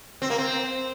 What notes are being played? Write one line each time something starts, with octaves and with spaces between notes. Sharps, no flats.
C4
A#3
C4